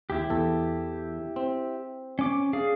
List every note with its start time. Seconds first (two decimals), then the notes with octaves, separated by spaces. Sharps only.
0.10 D#2 E4 G4
0.30 E2 A4
1.36 C4
2.19 C#4 D6
2.53 D4 G#4 F5